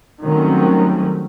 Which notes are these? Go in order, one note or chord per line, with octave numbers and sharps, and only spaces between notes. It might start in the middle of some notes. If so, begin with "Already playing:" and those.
D#3 F#3 G3 A3 C4 C#4